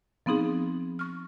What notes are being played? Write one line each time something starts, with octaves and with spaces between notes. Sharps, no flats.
F3 B3 C4 D#4 G#4
C#6 F6